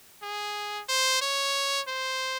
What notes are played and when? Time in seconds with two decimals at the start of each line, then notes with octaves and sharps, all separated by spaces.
0.23 G#4
0.89 C5
1.22 C#5
1.88 C5